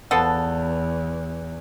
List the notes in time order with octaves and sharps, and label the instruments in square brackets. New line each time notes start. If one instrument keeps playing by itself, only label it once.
[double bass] E2 [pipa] F3 B3 A4